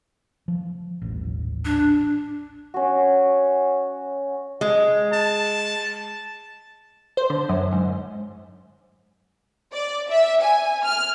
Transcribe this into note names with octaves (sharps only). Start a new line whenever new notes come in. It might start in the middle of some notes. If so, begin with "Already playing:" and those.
F3
D#1 A1
D4
C#4 F#4
G#3
A5
C5
D3
F#2
G#2
D5
E5
G#5
F6